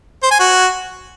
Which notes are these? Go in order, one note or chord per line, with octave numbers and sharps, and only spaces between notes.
C5
G#5
F#4